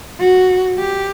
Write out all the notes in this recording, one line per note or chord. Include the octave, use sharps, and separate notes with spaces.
F#4
G4